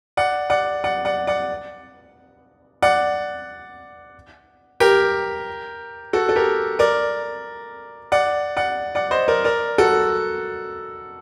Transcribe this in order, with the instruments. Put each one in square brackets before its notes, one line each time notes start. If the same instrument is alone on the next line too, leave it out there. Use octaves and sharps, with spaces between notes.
[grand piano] D5 F#5
D5 F#5
D5 F#5
D5 F#5
D5 F#5
D5 F#5
G4 A#4
F#4 A4
A4
G4 A#4
A#4 D5
D5 F#5
D5 F#5
D5 F#5
C5 D#5
A#4 D5
A#4 D5
F#4 A4